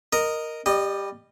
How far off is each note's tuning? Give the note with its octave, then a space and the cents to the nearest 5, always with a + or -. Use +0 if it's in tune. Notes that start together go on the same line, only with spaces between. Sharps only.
A#4 +0 D#5 -5
G3 +10 D#5 -15